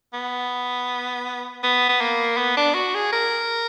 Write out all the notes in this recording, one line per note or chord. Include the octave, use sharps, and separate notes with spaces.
B3
B3
B3
A#3
B3
D4
F#4
G#4
A#4